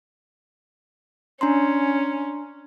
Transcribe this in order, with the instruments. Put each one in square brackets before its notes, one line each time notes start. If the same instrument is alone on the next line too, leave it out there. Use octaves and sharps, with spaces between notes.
[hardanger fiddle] C#4 [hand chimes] D4 A#5 C6